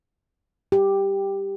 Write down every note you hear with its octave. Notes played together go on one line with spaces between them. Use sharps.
G4